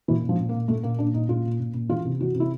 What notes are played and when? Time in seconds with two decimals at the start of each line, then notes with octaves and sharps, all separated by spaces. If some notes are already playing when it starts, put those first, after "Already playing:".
0.08 A#2 E3
0.23 A#2
0.29 F3
0.39 A#2
0.49 A#3
0.54 A#2
0.68 A#2 A3
0.83 A#2 A#3
0.98 A#2 D4
1.14 A#2 D#4
1.29 A#2 F4
1.45 A#2
1.60 A#2
1.74 A#2
1.89 E3 F4
2.05 C3
2.20 E3 F#4
2.35 C3
2.40 E4